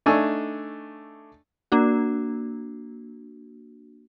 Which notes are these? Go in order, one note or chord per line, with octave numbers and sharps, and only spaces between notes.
A3 D4 D#4 G#5 C#6 E6
A#3 D4 F#4